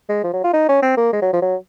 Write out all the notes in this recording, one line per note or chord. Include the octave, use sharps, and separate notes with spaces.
G#3
F3
F#3
F4
D#4
C#4
C4
A#3
G#3
F#3
F3
F#3